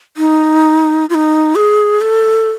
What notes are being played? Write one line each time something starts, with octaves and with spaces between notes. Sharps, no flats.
D#4
F4
D#4
G#4
A4